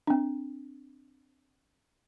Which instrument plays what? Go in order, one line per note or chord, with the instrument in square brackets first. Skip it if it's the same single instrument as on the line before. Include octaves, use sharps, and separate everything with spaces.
[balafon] C4 D4